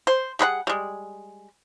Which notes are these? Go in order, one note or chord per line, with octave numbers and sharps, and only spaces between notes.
C5
G3 G#4 B4 F#5
G3 G#3